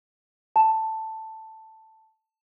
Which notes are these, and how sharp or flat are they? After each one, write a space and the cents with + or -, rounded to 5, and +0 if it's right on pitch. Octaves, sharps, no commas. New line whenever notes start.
A5 +5